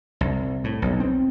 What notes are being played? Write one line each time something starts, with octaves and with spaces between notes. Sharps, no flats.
C2
A2
B1
C4